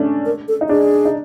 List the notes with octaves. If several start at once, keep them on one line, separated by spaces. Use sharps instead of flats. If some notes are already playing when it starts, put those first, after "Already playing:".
Already playing: A3 C#4 D4
A#4
A4
D#4
D4 G#4
D#4